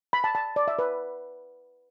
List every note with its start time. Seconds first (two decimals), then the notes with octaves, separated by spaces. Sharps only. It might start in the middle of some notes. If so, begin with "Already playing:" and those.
0.13 B5
0.24 A5
0.35 A5
0.56 D5
0.68 E5
0.79 B4